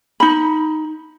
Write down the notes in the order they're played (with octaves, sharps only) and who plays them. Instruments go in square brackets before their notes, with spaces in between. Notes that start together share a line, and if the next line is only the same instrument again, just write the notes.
[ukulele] D#4 B5